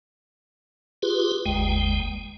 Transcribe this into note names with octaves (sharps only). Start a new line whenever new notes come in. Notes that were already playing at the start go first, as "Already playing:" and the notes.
F4 G4 G#4 B4
G1 D#2 G#3 G5